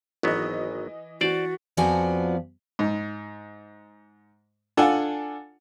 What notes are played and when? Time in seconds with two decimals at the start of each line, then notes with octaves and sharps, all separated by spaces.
0.23 G#1 E3 F#3 B3 D#5
1.21 E3 F#4 C5 D5 A6
1.77 F2 F3 B3 F#4 D5 G#5
2.79 G#2
4.77 D4 F4 A4 F#5 G#5